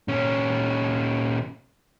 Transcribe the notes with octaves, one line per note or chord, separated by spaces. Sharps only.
A#2 C#4